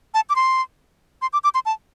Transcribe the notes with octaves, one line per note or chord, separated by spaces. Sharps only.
A5
D6
C6
C6
D6
D6
C6
A5